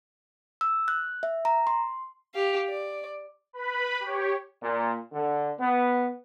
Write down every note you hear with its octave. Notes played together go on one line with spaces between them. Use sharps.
E6
F#6
E5
A#5
C6
G4 F5
D5
B4 B5
G4 C#5
A#2
D3
B3